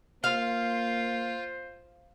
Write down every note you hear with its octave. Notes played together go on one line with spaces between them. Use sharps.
A#3 F4 C5 F5